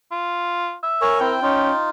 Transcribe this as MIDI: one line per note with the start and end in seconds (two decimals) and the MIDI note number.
0.12 0.75 65
0.83 1.19 76
1.02 1.33 70
1.02 1.20 73
1.02 1.20 80
1.02 1.20 85
1.20 1.40 60
1.20 1.40 64
1.20 1.78 79
1.42 1.71 61
1.42 1.90 63
1.42 1.90 65